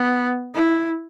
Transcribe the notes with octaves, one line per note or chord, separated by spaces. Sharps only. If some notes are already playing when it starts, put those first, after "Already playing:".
Already playing: B3
E4